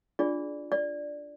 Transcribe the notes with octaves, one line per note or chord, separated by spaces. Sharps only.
D4 F4 G#4 D5
D5